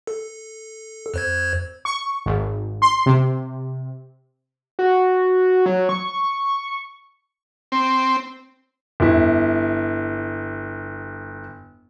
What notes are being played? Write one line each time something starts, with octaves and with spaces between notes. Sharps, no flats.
A4
F2 C5 G#6
C#6
G#1
C6
C3
F#4
F#3
C#6
C4
G1 E4